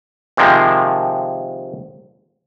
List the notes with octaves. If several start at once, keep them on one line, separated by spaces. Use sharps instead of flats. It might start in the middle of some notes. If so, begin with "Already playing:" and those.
C3 D#3 F3 G#3 A#3